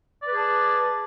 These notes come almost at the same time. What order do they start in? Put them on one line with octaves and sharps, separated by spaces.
D5 B4 G#4 A5